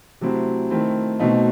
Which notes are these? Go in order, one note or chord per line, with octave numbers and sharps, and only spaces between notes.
C3 F#3 A3 C4 E4
D#3 A3 C4 E4
B2 A3 C4 D#4